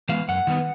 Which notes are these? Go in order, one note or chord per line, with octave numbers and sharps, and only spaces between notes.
E3 G#3 B3 F5
F#2 F#5
D#3 G3 B3